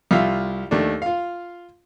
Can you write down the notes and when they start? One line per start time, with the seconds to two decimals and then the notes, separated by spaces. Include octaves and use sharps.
0.11 C2 F4 E5 F5
0.71 D#2 A3 D4
1.02 F4 F5